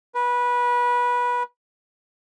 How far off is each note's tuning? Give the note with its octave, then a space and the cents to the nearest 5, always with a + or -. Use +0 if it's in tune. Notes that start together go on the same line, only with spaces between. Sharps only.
B4 -20